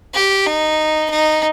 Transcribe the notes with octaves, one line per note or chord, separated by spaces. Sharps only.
G4
D#4
D#4